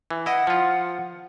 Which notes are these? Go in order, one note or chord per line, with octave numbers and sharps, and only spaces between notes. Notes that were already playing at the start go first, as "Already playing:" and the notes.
E3
E4 D#5 F#5
F3 F4